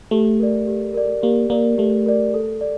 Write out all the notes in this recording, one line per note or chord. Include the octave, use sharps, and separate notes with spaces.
A3 G4
A#4 D5
G4
A#4 D5
A#3 G4
A#3 A#4 D5
A3 G4
A#4 D5
A4
D5